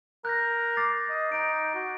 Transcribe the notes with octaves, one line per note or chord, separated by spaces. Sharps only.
A#4 F#6 G6 A#6
D6 A6 C7
D#5
D#4 D7
F#4